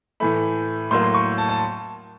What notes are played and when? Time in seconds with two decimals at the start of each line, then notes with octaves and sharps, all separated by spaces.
0.20 A2 E3 A3 B5
0.91 A2 F#3 A#3 C6
1.03 C6
1.14 C#6
1.38 A5
1.49 A5